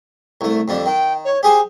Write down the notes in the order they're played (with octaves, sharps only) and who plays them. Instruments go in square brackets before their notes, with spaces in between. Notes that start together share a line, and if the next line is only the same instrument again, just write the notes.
[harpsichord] C2 A3
F2 D3 G3
[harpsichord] D#3 [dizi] G5
[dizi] C#5
[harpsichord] G4 G#4 C5 [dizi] G#5